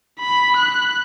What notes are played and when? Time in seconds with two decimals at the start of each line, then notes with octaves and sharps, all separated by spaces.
0.20 B5
0.57 F#6